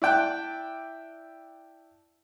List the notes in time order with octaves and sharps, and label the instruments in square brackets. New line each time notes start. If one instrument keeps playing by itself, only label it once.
[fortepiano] E4 D5 G5 A5 F#6